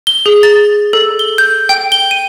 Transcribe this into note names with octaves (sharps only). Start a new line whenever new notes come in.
G7
G#4
A6
A4
G7
G6
G5
G7
D#7